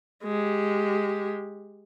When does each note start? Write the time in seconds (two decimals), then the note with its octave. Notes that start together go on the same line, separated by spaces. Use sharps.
0.24 G#3 G4